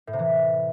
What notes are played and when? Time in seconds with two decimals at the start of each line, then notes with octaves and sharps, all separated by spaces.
0.07 A2
0.13 C3
0.19 E3